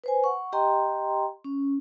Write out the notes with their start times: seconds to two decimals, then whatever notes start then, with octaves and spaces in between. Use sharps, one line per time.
0.04 B4 C5 G#5
0.24 F#5 C#6
0.53 G4 D#5 G5 A#5 C6
1.45 C#4